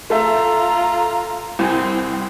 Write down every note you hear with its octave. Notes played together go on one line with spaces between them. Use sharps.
A3 F4 A4 E5 A#5
C2 C4 G#5